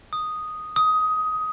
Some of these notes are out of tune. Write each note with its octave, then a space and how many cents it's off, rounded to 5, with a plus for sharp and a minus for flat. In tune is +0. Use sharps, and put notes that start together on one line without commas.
D#6 -5
D#6 +15